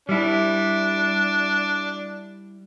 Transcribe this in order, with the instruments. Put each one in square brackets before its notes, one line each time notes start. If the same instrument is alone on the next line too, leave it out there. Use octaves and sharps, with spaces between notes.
[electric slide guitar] G3 E4 [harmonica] D4